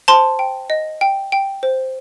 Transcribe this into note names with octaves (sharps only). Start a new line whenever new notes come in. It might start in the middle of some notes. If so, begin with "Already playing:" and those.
C5 A5 C6
G5
D#5
G5
G5
C5